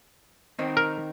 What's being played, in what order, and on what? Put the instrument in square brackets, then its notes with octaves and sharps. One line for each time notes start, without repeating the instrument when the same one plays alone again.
[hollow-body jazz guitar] D#3 C4 D#4
[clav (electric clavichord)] A#4